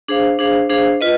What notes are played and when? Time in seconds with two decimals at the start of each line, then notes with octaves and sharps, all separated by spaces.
0.08 D4 G#4 C5 F5
0.39 D4 G#4 C5 F5
0.69 D4 G#4 C5 F5
1.01 F4 B4 D#5